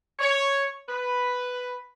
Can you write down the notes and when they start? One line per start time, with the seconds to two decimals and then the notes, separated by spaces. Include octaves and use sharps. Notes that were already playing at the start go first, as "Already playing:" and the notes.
0.19 C#5
0.89 B4